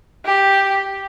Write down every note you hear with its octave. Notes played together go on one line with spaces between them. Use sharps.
G4